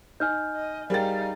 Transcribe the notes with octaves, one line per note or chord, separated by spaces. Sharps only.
D#4 G#5 F6 G6
D#5
G3 D#4 G#4 A#4 F5 G5 A6